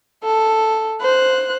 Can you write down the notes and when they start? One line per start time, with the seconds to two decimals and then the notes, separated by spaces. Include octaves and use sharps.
0.24 A4
1.01 C5 F#6